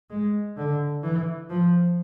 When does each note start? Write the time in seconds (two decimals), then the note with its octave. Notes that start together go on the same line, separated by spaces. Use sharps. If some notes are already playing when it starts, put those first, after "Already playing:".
0.10 G#3
0.57 D3
1.03 E3
1.49 F3